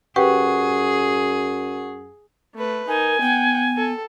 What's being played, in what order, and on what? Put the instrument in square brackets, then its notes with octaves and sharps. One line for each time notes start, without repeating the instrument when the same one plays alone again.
[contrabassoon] F#2 [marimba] G4 B4 G5 [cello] G#4 [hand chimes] F#5 C#6
[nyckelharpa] A3 B4
[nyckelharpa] D#4 [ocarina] A#4 [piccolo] G#5
[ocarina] B3 [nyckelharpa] F#5 G5
[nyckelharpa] A4